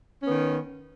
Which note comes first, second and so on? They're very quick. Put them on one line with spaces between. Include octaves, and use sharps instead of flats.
C#4 B3 D#3